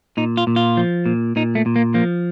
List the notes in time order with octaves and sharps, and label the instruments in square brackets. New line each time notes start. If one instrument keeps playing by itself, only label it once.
[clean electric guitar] A#2 D#4
F4
A#2
F4
F3
A#2
A#2 D#4
A3
A#2
A#3
F3 A#3